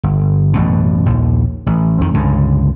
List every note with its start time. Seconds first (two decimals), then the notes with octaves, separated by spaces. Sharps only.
0.03 G1
0.53 A1 F#2 B2
1.06 A#1 D#2
1.66 A1
2.01 F2 D#3
2.14 C#2 G2 D3